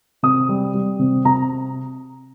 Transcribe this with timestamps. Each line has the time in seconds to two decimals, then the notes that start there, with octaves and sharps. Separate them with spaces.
0.23 C3 D#6
0.49 G3
0.74 G3
0.99 C3
1.25 C3 A#5